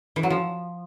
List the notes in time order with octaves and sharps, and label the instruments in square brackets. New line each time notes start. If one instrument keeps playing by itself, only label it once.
[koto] E3
F#3
F3